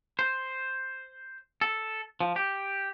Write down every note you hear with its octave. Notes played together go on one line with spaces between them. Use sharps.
C5
A4
F3
G4